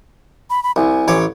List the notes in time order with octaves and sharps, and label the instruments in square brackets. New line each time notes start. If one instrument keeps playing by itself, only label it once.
[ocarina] B5
B5
[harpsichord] C2 [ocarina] G#5
[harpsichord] A1 C#5 D6